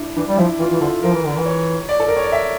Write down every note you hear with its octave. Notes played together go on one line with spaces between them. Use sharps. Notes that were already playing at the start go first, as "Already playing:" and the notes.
Already playing: D4 E4
E3 D4
G3
F3 E4
E3 F4
E3
D3 A4
F3 A#4
E3
D3
E3
C#5
D5
A4
A#4
C#5
D5
E5